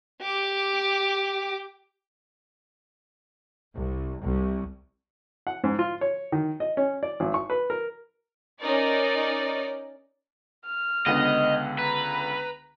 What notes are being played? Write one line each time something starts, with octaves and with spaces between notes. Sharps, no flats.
G4 D6
C2
C2
F#5
G#2
F4
C#5
D#3
D#5
C#4
D5
G#1
C#6
B4
A#4
C#4 D#4 A#4 D5
F6
C#2 D3 B3 D#5
B4 A#5